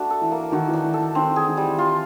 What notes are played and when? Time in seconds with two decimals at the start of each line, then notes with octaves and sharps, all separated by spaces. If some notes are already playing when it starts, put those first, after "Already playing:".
Already playing: A3 D4 F#4
0.10 A4
0.21 E3
0.32 A#3
0.52 D#3 F#4
0.68 E3
0.73 D4
0.84 E3
0.94 A4
1.00 E3
1.15 D#3 C4
1.31 E3
1.36 G#4
1.47 D#3
1.57 E3 G3
1.77 E3 F4